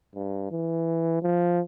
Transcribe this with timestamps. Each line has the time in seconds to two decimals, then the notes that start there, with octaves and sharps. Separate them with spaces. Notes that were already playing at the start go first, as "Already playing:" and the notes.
0.15 G2
0.51 E3
1.23 F3